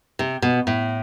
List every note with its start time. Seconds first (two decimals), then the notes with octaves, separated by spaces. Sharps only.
0.19 C3
0.42 B2
0.67 A2